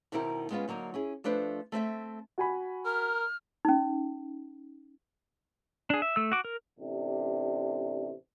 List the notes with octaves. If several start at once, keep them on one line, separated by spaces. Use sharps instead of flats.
D#2 B2 D#3 C4 E4 A#4
G#3 B3 C#4 F4 B4
D3 F#3 A#3 D#4
C#4 E4 G#4
F3 A3 D4 B4 C5
A3 C4 A4 E5
F#4 G#5 B5
A#4 F6
C#4 D#4
D4 G#4
E5
A3 E6
F#4 D6
A#4
A1 C3 D4